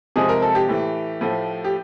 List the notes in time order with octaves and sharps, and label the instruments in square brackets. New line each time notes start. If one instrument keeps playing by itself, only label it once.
[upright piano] C3 F3 G#3 G#4
A#4
A4
G4
A2 E3 A3
A2 F3 A3
G4